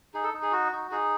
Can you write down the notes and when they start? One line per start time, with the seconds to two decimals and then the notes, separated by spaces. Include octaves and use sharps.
0.14 D#4 G#4
0.23 A4
0.34 D#4
0.43 G#4
0.52 F#4
0.72 D#4
0.91 D#4 G#4